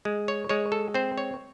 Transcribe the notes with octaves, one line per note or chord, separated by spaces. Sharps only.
G#3
C#5
G#3 C#5
A4
C4 C5
C#5